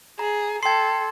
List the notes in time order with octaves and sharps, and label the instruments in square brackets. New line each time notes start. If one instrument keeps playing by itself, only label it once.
[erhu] G#4 [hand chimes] A#5
[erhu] A4 [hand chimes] G5 C7 [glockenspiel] C6 G#6